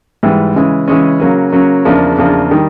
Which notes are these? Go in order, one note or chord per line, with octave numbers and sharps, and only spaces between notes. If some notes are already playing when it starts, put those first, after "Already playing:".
G#2 E3 G3
C#3 E3 G#3 C#4
C#3 E3 G#3 C#4
C#3 F#3 A#3 C#4
C#3 F#3 A#3 C#4
E2 C#3 F3 A#3 D4
E2 C#3 F3 A#3 D4
D#3 G3